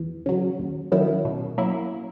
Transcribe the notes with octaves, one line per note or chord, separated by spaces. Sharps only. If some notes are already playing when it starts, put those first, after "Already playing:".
Already playing: E2
C#3 F#3
D#2
D#3 F#3 C#4 E4
B2
F#3 A#3 C#4 E4